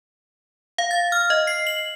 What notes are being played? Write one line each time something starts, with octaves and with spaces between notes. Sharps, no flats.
F5
A6
F6
D#5
C7
F#7